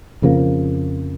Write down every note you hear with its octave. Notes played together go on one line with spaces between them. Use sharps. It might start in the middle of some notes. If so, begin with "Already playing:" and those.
F2 C#3 F3 A#3